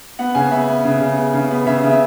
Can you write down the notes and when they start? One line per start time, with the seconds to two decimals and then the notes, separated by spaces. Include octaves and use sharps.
0.19 B3 F#5
0.35 C#3 G#5
0.51 B3 E5
0.68 B3
0.85 C#3
1.00 C#3
1.17 B3
1.34 C#3
1.51 B3
1.66 C#3 E5
1.84 C#3
1.91 E5